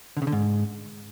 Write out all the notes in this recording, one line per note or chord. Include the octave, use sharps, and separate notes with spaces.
D3
C#3
D3
G#2